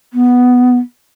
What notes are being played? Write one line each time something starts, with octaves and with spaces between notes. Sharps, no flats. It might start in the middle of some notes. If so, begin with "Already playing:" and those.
B3